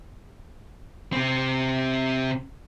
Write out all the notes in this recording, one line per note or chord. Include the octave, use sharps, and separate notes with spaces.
C3 C4